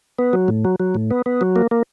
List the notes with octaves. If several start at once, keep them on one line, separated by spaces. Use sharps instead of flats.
B3
F#3
A2
F#3
F#3
A2
B3
B3
F#3
A#3
A#3